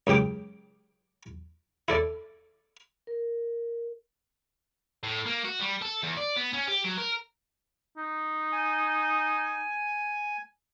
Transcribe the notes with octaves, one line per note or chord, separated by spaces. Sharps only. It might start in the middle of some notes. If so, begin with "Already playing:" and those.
C#2 F#2 G4 G5 D6
E4 A4 D5
A#4
A2
A#3
F#4
G3
A4
E2
D5
B3
C#4
G4
F#3
A#4
D#4
G#5